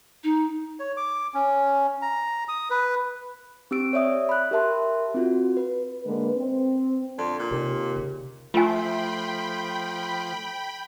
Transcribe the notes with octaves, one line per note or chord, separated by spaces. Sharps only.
D#4
C#5
D6
C#4
A#5
D#6
B4
C4 G4 E6 D7
C#5 D5 E5 D#6
B5 F#6
G4 A#4 E5 A5 C6
C4 F4 F#4
B4
D3 G#3 A#3 B4
C4
F2 D3
A#2
D#2 C3
C#3 A#3
F3 A3 F4 C5 G5 G#5 B5